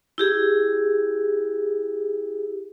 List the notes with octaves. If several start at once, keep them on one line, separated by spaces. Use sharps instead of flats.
E4 G4 G#4